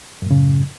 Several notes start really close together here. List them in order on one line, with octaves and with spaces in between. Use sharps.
F#2 A2 C#3